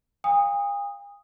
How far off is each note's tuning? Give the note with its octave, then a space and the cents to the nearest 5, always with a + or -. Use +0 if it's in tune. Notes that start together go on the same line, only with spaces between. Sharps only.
F5 +25 G#5 -45 D#6 +0